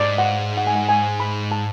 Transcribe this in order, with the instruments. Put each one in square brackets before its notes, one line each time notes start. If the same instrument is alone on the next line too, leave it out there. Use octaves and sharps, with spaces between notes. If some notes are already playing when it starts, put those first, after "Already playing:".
Already playing: [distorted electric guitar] G#2 [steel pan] D5
[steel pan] F#5
F5
F#5
G#5
F#5
G#5
B5
A5